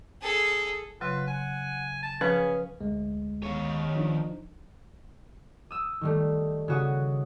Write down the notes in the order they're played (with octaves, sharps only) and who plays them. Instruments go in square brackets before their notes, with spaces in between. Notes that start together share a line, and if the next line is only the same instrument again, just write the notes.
[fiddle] G#4 A4
[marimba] C#3 F#3 [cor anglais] F4 [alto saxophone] B4
[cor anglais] F#5 [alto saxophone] G#5
[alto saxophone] A5
[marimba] F3 [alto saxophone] C#4 [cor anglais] G#4 [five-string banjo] B4
[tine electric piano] D2 G#3
[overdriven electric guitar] D#3 C#5
[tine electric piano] F3 D4 D#4
[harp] D#6 E6
D#3 G3 A3
C#3 F#4 D#6